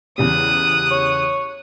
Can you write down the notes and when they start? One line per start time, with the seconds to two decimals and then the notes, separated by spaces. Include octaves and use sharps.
0.18 E2 C#3 G3 D#6 F#6
0.91 C#5